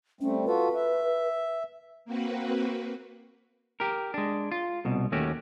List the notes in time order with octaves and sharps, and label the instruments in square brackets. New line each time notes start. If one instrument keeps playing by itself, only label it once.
[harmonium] G3 A3 C4 [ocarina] C#4
[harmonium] F4 F#4 A4 [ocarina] B4
[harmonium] E5
[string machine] A#3 C4 F#4 B4
[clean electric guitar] G4 A#4
G#3 D4
F4
C2 B2
D#2 A3 C#4 F#4 G4